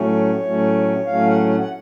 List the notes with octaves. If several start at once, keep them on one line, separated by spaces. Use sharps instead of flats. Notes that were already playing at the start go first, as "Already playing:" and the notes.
Already playing: A2 F#3 A3 C#4 C#5
A2 F#3 A3 C#4
A2 F#3 A3 C#4 F5
F#5
F#5
F#5